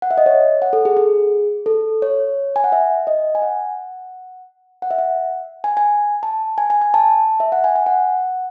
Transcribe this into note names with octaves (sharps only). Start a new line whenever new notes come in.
F#5
E5
D#5
C#5
F#5
A4
G#4
G#4
A4
C#5
G#5
F#5
E5
D#5
G#5
F#5
F#5
E5
F#5
G#5
G#5
A5
G#5
G#5
G#5
A5
E5
F#5
G#5
G#5
F#5